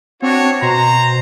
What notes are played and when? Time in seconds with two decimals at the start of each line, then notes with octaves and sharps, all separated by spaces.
0.22 C4 D4 F#4 C#5
0.62 B2 C5 A#5